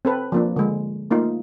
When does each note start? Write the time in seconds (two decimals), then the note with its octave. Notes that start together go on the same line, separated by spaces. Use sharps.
0.05 C4 A4 B4
0.32 F3 A#3 D4
0.56 D3 G#3
1.11 A3 A#3 D#4 F4